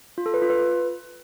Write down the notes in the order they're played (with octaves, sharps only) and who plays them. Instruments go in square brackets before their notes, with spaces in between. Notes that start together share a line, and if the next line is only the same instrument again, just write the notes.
[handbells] F4
A4
B4
F4
B4